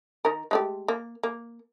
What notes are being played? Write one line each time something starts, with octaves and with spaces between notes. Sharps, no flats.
D#3 A#4
G#3 A3 G4
A#3
A#3